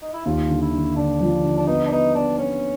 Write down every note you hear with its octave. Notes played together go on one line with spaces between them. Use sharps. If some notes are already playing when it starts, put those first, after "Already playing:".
D#4
E4
D#2 F4
D3
E4
D3
D3 D4
F3
D3
D4
B3 D#4
D4
B3 D#4
B3 D4
B3 C#4